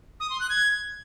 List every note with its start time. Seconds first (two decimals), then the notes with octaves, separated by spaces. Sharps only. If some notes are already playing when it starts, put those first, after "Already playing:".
0.20 D#6
0.30 C6
0.40 F#6
0.50 G#6